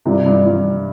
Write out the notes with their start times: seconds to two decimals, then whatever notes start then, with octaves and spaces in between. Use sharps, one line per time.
0.05 G2 C3
0.26 G2
0.46 G2